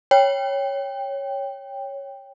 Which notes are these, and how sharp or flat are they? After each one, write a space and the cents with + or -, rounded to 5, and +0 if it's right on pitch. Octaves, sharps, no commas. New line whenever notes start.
C#5 +0 G5 +10